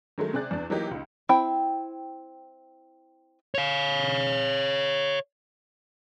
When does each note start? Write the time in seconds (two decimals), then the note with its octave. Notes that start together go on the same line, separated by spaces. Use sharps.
0.18 D#3 F#3 G#3 A3
0.33 C3 C4 G#4 D5 F#6 A6
0.51 E2 D4
0.70 E3 F#3 A#3 D#4 G4 D#5
0.91 C#2 D#4
1.29 C4 E4 G5
3.55 C#5 F5